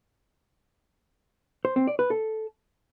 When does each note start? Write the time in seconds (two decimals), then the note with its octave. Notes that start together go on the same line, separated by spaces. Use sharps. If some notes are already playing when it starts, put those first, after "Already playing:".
1.65 C5
1.76 C4
1.87 D5
1.99 B4
2.10 A4